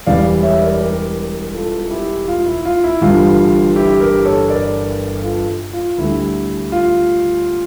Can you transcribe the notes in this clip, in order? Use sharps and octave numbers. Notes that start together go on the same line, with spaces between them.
E1 E2 E3 G3 D5 F5
C#5 E5
A#4 D5
G4 A#4
F4 A4
E4 G4
F4
E4
F4
E4
G1 G2 E3 G3 F4
E4 G4
G4 A#4
A4 C#5
A#4 D5
F4 A4
F4
D2 D3 G3 E4
F4